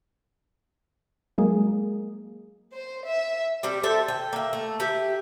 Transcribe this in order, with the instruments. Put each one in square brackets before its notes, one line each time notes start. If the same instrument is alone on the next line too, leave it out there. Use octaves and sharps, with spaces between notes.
[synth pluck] F#3 G#3 A#3 G#4
[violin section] C5
E5
[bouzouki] G3 C4 G4
A4 C5 E5 G5
G5
A#3 E5
A3
G4 B4 E5